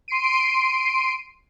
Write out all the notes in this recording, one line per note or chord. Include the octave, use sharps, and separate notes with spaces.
C6 C7 D7 D#7